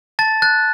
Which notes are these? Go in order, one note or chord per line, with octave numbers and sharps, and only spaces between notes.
A5 A6
F#6 A6